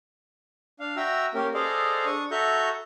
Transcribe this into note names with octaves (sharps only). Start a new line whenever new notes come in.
D4 F5
F#4 E5 G5 A#5 E6
A#3 C#4 G4 A#4
G#4 A4 C5 D5 D#5 F5
D4 C#6 D#6
F#4 A4 E5 A#5 C#6 G6